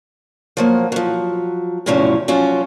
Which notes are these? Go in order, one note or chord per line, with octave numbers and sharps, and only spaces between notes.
F3 F#3 A#3
F3 F#3
E2 A2 C3 F3 F#3 C#4
F3 F#3 C#4 F4 F#4